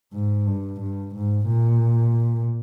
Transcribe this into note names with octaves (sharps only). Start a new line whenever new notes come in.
G#2
G2
G2
G#2
A#2